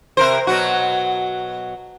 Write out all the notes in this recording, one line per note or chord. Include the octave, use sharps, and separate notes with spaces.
C3 A#4 C5
B2 F#3 F#4